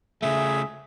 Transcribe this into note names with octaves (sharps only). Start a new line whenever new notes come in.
C#3 A3 G#4 E5